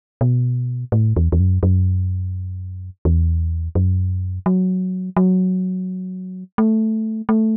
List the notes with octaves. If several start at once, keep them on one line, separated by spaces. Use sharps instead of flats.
B2
A2
E2
E2
F#2
F#2
E2
F#2
F#3
F#3
A3
A3